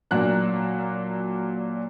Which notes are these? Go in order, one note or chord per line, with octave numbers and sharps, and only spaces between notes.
A#2 F#3 A#3 D4 F#6